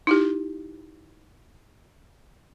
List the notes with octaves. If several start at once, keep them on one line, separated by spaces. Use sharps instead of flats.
D#4 E4 G4